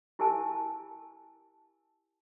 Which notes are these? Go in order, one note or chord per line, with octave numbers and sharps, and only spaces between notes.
E4 G4 A#4 G#5 A5